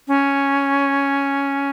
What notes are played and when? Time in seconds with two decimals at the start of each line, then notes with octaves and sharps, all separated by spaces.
0.08 C#4